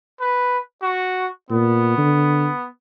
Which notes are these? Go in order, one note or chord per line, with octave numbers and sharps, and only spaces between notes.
B4
F#4
A#2 B3
D3